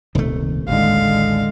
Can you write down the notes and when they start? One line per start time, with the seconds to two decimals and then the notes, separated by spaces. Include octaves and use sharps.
0.15 D#1 C#2 C3 D#3 A3
0.68 A1 D#2 D3 D#3 G#3 F5